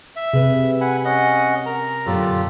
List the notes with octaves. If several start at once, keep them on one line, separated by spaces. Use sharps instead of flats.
E5
C3 G#4 B4
F#5 G#5 B5
C#4 D#5 F#5
A#4 A#5
F#2 A#2 D3 F4 G4 A4